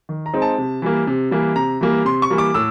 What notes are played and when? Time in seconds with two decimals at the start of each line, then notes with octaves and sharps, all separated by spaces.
0.09 D#3
0.26 A#5
0.33 G#3 C4 D#4
0.42 A5
0.58 C3
0.82 E3 G3 A#3
1.07 C3
1.31 E3 G3 A#3
1.56 C3 A#5
1.81 E3 G3 A#3
2.05 C3 C6
2.22 C#6
2.30 E3 G3 A#3
2.38 D6
2.54 A2 E6